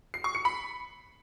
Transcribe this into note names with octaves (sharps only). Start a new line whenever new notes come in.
C7
C#6
C#7
B5